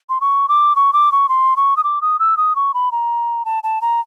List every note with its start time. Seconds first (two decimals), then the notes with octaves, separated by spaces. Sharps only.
0.09 C6
0.21 C#6
0.49 D6
0.76 C#6
0.93 D6
1.12 C#6
1.29 C6
1.56 C#6
1.77 D#6
1.84 D6
2.01 D#6
2.19 E6
2.37 D#6
2.56 C#6
2.74 B5
2.92 A#5
3.45 A5
3.63 A5
3.81 A#5